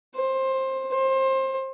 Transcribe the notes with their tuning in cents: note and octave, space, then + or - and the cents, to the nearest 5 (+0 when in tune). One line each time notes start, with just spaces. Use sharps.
C5 +20
C5 +25